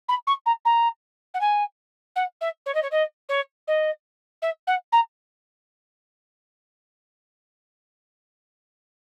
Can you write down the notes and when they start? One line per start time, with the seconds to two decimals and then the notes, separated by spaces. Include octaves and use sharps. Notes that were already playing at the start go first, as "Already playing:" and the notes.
0.08 B5
0.27 C#6
0.46 A#5
0.65 A#5
1.34 F#5
1.40 G#5
2.15 F#5
2.41 E5
2.66 C#5
2.74 D#5
2.82 C#5
2.91 D#5
3.29 C#5
3.67 D#5
4.42 E5
4.67 F#5
4.92 A#5